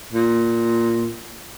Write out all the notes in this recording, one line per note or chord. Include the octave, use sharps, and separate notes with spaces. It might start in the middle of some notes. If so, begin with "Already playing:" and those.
A#2